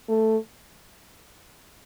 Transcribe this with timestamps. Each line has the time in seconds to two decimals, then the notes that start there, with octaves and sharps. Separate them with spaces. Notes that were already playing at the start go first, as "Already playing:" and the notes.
0.09 A3